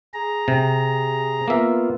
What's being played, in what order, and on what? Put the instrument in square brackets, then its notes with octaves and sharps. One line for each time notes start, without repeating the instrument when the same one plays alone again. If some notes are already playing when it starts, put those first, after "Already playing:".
[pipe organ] G#4 A#5
[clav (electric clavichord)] C3
[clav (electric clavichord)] A#3 E5 [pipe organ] B3 F4